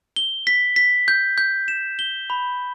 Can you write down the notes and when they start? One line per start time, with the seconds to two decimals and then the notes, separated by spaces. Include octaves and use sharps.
0.16 G7
0.47 B6
0.76 B6
1.08 G6
1.38 G6
1.68 E7
1.99 G7
2.30 B5